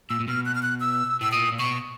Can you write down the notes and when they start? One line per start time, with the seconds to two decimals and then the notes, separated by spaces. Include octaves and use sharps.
0.10 A#2 E6
0.20 A#2
0.28 B2 F6
0.45 F#6
0.55 F6
0.63 F#6
0.80 E6
1.21 A2 E6
1.32 A#2 D#6
1.52 A#2
1.59 B2 C#6